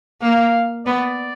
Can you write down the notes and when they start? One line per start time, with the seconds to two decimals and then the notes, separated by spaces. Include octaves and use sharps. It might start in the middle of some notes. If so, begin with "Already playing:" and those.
0.22 A#3 F5
0.86 B3 D5